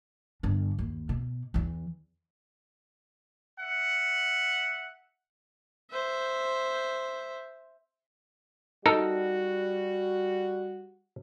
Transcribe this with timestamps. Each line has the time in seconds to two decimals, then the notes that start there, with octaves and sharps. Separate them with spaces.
0.43 G1 D4
0.79 D#2
1.09 B2
1.54 E2 E3
3.59 E5 F#5
5.90 C5 E5
8.86 G3 D#4 F#4 A4 A#4